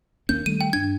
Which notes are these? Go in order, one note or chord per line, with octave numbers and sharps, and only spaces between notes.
D#2 A#3 C#4 G6
D#3 G3 A3 D#7
G5
G2 D4 G#6